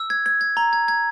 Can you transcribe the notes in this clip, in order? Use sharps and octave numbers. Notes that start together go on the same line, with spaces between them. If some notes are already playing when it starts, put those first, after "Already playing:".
Already playing: E6
G#6
G#6
G#6
A#5
G#6
G#6